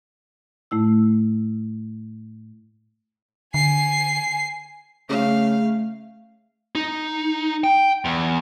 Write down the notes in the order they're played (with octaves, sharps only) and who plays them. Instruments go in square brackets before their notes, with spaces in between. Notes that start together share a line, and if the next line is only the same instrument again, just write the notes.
[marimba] A2 A3 E4 E6
[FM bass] D3 [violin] G#5 C7
[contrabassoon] C#3 [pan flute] A3 [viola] F5
[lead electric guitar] D#4
G5
E2